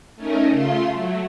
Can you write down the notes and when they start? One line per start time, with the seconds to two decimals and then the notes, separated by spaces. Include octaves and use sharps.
0.16 A3 C#4 D#4 A#4
0.48 C#3 A3 F4 C6
0.90 F#3 A3